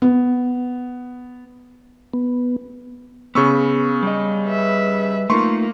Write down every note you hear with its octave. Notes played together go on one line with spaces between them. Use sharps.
B3
B3
C#3 B3 C#6 E6
G3 D#5
B4 E5
A3 A#3 D#4 F4 C6 C#6